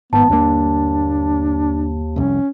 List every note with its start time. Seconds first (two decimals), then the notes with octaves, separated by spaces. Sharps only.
0.13 G#1 G#2 B3 A5
0.30 G1 D#2 A#3 D4
2.16 F1 C2 C#4